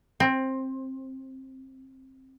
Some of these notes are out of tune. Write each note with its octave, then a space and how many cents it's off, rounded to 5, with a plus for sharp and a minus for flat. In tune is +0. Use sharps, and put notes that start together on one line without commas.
C4 +15